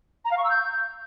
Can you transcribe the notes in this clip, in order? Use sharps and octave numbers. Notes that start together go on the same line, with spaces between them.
A#5
F5
C#6
E6
G6